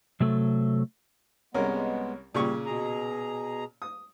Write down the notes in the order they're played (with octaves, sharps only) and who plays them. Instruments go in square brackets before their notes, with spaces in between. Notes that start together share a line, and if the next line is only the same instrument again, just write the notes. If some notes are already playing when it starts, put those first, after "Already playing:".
[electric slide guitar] C3 F#3 A3 A4
[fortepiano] C2 C#4 A#4 [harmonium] G#3 B3
[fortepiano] A#2 C#3 C#6 [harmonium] G3
[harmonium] B2 G#4 A#5
[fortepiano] D#6